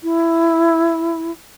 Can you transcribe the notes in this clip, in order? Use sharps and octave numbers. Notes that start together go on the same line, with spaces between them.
E4